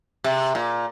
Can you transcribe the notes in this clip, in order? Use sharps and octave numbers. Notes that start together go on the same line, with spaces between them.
C3
A#2